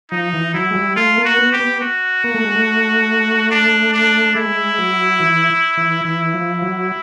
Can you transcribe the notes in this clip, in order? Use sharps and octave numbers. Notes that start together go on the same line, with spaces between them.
F3 D#4
E3
F#3 E4
G#3
G3
A3 F4
A#3
F#4
B3
G4
B3
F#4
A#3
A3
G#3
A3
D4
D4
G#3 E4
F#3
E3
E3
E3 E4
F3
F#3